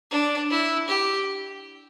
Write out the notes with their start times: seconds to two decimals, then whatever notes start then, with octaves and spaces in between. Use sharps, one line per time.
0.10 D4
0.50 E4
0.88 G4